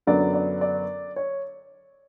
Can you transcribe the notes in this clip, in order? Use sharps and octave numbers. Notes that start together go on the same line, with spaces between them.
F#2 D3 F#3 B3 D5
D5
D5
C#5